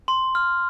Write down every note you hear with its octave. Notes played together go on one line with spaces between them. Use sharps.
C6
F6